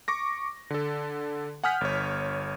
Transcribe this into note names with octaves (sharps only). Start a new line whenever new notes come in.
C#6 D6 A#6
D3 A4
F#5 G#5 D#6 F6 G6 B6
G1 C#5